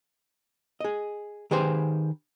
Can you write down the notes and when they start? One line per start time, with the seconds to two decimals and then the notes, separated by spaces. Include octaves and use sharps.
0.80 G#4 D#5
1.51 D#3 G4 G#4 B4 C5